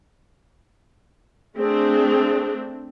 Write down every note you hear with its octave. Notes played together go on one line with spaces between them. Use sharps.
A3 C4 D4 G#4